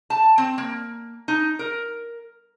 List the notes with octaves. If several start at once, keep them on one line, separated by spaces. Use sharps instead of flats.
A5
C4
A#3
D#4
A#4